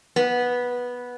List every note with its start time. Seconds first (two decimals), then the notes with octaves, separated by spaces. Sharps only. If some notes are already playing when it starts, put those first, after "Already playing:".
0.16 B3